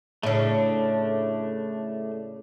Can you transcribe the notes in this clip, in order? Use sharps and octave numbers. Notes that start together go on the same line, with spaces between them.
A2 C#3 A3 D4